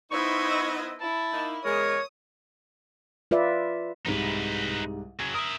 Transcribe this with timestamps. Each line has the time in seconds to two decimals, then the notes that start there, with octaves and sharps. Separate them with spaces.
0.11 B3 D#4 E4 C5 D#5 C#6
1.00 E4 A5
1.33 A#3 D#4
1.65 E2 C#3 G#3 A#4 C#5 D#6
3.31 F4 B4 D5 E5
4.06 C2 G#2 C3 D#4 B4
5.20 C#3 F#3 G#6
5.34 A#4 E5 D#6 E7